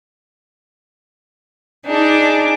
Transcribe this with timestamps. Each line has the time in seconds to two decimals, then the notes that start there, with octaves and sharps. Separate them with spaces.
1.87 D4 D#4 G#4 D6